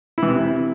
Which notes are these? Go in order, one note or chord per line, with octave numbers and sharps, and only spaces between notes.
C3 E3 E4